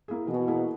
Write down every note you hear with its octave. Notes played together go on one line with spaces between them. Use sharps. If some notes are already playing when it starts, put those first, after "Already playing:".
A#3 E4 G#4
B2 E3
A#3 E4 G#4